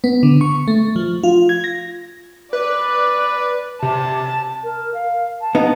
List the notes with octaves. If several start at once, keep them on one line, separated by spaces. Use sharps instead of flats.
B3
D3
C#6
A3
F3
F4
G#6
A#6
B4 D5
C3 A5
A#4
F5
A5
B3 D#4